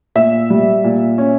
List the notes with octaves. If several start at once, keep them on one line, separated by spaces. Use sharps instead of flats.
A#2 E5
G3
A#2
C#4